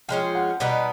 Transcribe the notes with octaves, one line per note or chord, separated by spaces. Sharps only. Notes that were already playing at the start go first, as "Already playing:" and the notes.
F3 G#3 C#4 F4 G5
F#5
B2 G3 B3 D#4 F#5